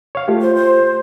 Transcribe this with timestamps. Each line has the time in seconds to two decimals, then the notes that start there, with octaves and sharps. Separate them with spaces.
0.15 C#5 F5
0.28 A3 F4 G4
0.41 C5
0.55 C5